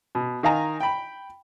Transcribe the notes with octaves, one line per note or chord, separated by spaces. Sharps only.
B2
D#3 D#4 F5 G#5 A#5
G5 B5